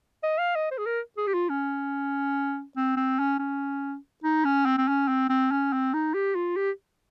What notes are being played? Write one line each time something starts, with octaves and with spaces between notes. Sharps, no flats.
D#5
F5
D#5
C5
G#4
A#4
G#4
G4
F4
C#4
C4
C4
C#4
C#4
D#4
C#4
C4
C4
C#4
C4
C4
C#4
C4
D#4
G4
F4
G4